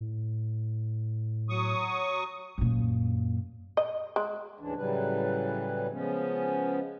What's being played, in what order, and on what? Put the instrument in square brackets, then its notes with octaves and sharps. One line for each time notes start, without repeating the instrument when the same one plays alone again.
[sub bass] A2
[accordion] F#3 C#6 D#6
[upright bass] F#2 A#2
[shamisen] D#5
G#3
[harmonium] D2 G#2 C#3 E3 D4
A2 C#3 E3 F#3 G3 B4
C#3 F3 G#3 B3 C#4